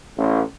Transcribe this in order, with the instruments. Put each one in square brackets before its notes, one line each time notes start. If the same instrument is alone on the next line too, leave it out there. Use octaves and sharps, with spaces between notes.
[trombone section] A1